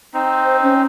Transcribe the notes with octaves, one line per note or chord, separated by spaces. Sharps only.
C4 D#4
C5
C#4